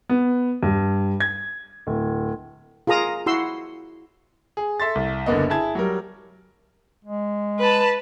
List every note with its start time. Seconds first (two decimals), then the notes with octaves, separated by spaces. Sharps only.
0.09 B3
0.63 G2
1.20 G#6
1.87 D1
2.87 F4 G#4 A#4 A#5 D#6
3.26 E4 F#4 C6 E6
4.57 G#4
4.80 A4 E5 C6 A6
4.95 C2
5.26 F#1 D3 A#3 B3 D#5
5.50 E4 G#4 A5 G#6
5.75 F#3 G3 A#4
7.05 G#3
7.59 B4 A5